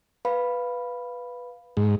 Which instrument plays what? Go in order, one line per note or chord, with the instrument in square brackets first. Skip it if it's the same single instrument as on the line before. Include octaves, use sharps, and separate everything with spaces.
[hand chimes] B4 F5 B5
[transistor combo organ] G#2